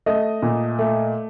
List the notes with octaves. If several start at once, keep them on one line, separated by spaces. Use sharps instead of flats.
A3 D#5
A#2
A3